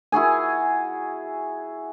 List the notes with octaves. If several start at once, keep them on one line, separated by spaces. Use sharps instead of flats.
E4 F#4 G#4 G#5